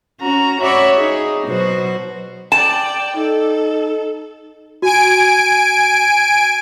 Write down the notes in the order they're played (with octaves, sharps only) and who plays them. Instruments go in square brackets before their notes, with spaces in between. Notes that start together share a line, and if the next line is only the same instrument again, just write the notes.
[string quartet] C#4 F#4 A#5
F#4 C#5 D5 E5 B5 C#6
D#4 G#4
B2 F#3 F#4 C5
[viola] D5 G5 [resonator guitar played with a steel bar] A5
[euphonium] D#4 [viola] A4
[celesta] F#4 [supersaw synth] G#5 D7